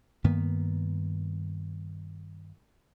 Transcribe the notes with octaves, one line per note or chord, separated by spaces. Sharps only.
G2 D#3 A#3 B3